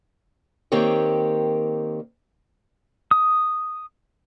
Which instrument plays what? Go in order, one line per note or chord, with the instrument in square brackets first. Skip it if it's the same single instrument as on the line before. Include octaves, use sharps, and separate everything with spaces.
[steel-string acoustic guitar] D#3 A#3 C4 G4 C#5
[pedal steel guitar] D#6